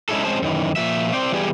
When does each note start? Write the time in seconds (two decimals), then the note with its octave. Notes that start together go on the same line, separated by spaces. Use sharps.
0.09 G#3 C#4 D#4 E4 G#4 A4
0.24 G#3 C4 C#4 G#4 C5 A5
0.42 F#2 D#3 E3
0.76 A#2 F3 E5
1.13 C4 C5 D5 G5
1.32 E3 G3 B3 G4 G#4 D5